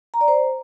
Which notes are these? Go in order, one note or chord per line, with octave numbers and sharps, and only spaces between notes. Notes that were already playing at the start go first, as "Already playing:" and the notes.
A#5
D5
C5